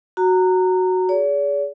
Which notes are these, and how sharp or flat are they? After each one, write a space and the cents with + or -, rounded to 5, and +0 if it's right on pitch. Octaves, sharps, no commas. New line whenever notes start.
F#4 +0 A#5 -20
G#4 +0 D5 -45